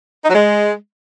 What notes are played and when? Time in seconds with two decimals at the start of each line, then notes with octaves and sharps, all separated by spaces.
0.25 D#4
0.30 F#3
0.35 G#3